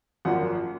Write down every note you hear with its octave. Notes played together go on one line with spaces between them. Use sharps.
G#1 F#2 F3 A#3 F4 F#5